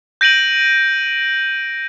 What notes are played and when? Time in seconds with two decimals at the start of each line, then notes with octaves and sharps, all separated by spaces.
0.21 G6 A#6 D7 D#7 F#7